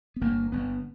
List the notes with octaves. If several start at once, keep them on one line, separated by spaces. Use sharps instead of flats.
B3
G1 G2 A#3
G1 G2 B3